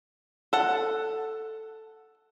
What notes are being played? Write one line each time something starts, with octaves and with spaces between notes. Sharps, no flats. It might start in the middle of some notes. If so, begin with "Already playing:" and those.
A4 F#5